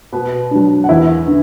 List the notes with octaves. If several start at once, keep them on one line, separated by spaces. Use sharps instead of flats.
B2 B3 B4
F#3 D4
F#5
E2 E4 E5
D3